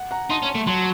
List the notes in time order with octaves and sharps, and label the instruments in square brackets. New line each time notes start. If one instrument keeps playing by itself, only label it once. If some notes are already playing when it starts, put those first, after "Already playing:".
Already playing: [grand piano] F#5
F#5 A#5
[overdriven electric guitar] D#4 [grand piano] A5 C6
[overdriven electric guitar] C#4
A3
[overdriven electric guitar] F#3 [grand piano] A5 C6